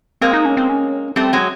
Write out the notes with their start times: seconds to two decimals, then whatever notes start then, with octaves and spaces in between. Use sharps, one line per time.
0.21 G#3 A#3 C4
0.33 D#4
0.45 C#4
0.57 C4
0.69 C#4
1.16 G3 A3 C4
1.33 F#3 G#3